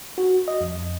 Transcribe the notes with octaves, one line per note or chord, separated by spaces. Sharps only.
F#4
D#5
F2